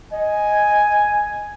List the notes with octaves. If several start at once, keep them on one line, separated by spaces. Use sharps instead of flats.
D#5 G#5